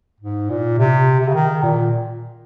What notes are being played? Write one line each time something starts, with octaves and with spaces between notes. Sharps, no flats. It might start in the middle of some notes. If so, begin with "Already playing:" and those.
G#2
A#2
C3
C3
C#3
D#3
A#2